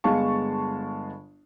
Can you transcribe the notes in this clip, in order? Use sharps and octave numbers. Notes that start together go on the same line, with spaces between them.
G1 G#3 B3 F5 A5 C#6